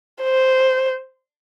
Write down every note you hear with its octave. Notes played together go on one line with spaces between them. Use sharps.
C5